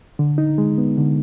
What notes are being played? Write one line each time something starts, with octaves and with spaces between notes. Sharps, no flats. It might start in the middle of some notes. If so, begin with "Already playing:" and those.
D3
D#4
G#3
B3
D3